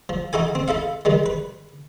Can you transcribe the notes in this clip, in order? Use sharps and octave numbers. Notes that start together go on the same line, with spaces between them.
F3
D#4 E4 F#4 A4 G#5
C4
E4 A4 E5 F5
D#3 G3 G#3
B4